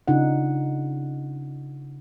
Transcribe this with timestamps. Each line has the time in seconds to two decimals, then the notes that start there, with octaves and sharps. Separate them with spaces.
0.08 C#3 D4 D#4 F4 F#5